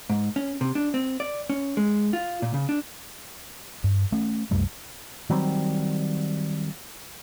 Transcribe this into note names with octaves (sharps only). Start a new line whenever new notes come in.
G#2
C#4
C3
D4
C4
D5
C#4
G#3
F4
A#2
C#3
D4
G2
A3 C#4
C2 F#2 G3 A3
D#3 F#3 G3 C4